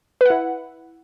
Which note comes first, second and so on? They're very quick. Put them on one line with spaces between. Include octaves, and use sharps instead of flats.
B4 F#5 E4